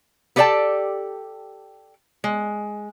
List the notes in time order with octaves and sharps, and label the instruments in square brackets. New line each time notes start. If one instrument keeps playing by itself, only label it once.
[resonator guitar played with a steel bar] B3 G4 A4 D5 G5 A5
G#3